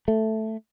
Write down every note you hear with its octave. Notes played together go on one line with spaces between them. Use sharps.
A3